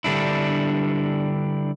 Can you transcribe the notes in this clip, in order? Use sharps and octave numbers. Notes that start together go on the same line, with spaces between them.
D3 G3 D4 E4